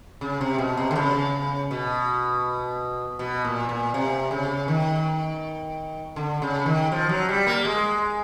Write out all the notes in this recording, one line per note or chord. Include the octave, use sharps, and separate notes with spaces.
C#3
C3
B2
C3
D3
C#3
B2
B2
A#2
A#2
C3
C#3
D#3
D3
C#3
D#3
F3
F#3
G3
A#3
G#3